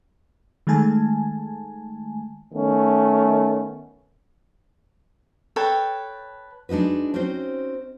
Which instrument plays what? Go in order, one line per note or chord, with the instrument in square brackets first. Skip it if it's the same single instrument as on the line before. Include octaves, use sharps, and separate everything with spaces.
[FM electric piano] D#3 G#3 A3 G#5 A5
[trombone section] D#3 A3 B3 C#4
[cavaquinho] A4 B4 C#5 G5
[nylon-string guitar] G#3 D4 D#4 F#4 B4
C4 C#4 D#4 F#4 C5